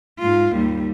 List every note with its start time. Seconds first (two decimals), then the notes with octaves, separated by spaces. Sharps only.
0.19 G#2 F4
0.55 D#2 G3